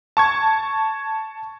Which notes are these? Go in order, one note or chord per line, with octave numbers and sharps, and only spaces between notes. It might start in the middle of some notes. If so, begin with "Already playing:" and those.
A5 C#6 G#6